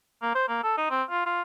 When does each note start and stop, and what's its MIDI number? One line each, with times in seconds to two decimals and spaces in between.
0.22 0.33 58
0.35 0.43 72
0.48 0.61 58
0.63 0.75 69
0.77 0.85 63
0.90 1.03 60
1.10 1.25 65
1.26 1.42 65